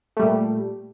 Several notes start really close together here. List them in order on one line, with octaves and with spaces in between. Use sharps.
A3 G3 A#2